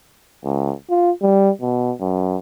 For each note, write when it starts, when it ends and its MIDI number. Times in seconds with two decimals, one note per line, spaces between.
0.44 0.73 37
0.90 1.11 65
1.22 1.50 55
1.61 1.92 47
2.00 2.37 42